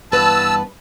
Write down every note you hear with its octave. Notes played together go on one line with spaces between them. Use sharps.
G2 E3 B3 B4 A5 E6